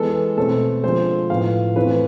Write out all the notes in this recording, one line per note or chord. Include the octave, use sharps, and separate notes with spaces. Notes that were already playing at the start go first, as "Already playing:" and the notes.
Already playing: E3 G#3 B3 A4
B2 A3 C4 A4
D3 F3 G#3 C5
A2 F3 B3 F5
E3 A3 C4 B4